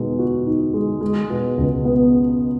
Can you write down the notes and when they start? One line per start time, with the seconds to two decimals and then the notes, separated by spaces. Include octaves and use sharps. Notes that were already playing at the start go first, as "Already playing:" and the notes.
Already playing: B2 G#3 D#4
0.19 F#4
0.47 D#4
0.74 G#3
1.01 G#3
1.30 B2
1.57 C#2
1.85 B3